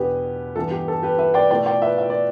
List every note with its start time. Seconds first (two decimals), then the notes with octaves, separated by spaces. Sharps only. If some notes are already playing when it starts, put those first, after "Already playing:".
Already playing: E2 B2 B3 D4 G4 B4
0.56 G2 E3 B3 A4
0.71 G4
0.88 A4
1.03 G4 B4
1.19 B4 E5
1.34 D5 G5
1.50 B2 A3 E4 D5 G5
1.66 D5 G5
1.82 B4 E5
1.98 E5
2.10 D5